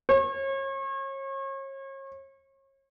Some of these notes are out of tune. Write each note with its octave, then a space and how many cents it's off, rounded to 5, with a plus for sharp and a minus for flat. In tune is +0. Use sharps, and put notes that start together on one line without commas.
C#5 -35